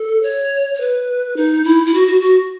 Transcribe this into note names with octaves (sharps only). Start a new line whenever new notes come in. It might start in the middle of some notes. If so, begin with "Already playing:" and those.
Already playing: A4
C#5
C#5
B4
D#4
E4
E4
F#4
F#4
F#4